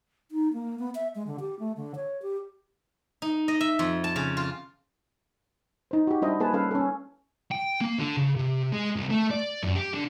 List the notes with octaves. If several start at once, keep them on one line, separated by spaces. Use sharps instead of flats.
D#4
A#3
B3
E5
G#3
D3
G4
A3
D3
C#5
G4
D#4
D#5
E5
F2
A5
C#3
F4
D#4 C5
F#4 G4
G3 D4 E4 C5 D#5
A#3 G#4 B4 C5 A5
G3 C#4 A4 B4 F5
C#4 A4
G5
A#3
D3
C#3
C3
G#3
C2
A3
D5
F#2
G4
D3